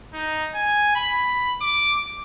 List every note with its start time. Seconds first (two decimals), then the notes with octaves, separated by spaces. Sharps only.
0.14 D#4
0.55 G#5
0.96 B5
1.62 D6